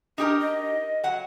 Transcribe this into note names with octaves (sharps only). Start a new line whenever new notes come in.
D4 D#4 G4 A#4
D#5
F#3 F#5